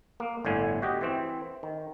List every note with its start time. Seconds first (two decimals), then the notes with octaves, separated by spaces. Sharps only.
0.20 A#3
0.45 G1 A2 D3 G#5
0.82 F#4 G4 D#5
1.01 E3 C4
1.63 D#3